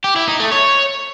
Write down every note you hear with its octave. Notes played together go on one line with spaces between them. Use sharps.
G4
E4
D#4
A3
C#5